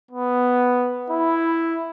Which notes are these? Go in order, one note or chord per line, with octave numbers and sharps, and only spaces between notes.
B3
E4